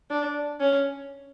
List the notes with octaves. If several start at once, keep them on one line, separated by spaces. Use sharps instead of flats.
D4
C#4